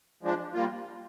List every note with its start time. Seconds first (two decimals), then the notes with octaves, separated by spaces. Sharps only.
0.23 F3 G#3 D4
0.53 G3 A#3 F4